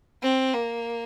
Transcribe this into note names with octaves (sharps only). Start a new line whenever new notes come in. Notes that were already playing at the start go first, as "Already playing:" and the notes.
C4
A#3